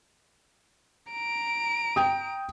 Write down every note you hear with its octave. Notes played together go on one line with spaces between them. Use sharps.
A#5 D7
G5 D#6